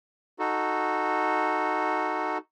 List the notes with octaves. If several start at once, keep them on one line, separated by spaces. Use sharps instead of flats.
D#4 F#4 A4